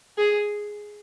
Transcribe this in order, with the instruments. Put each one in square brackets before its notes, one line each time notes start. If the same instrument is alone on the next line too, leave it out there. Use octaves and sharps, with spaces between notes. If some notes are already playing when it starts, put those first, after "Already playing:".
[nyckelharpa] G#4